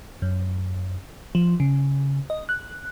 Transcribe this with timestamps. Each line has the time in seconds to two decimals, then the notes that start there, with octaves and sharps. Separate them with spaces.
0.22 F#2
1.35 F3
1.60 C#3
2.30 D#5
2.49 F#6